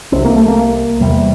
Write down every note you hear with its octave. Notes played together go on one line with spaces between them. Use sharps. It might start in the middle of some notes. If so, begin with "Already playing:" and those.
C2 C3 C4
A#3
A3
A#3
E2 C3 G3